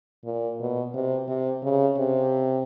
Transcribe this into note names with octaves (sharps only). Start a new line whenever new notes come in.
A#2
B2
C3
C3
C#3
C3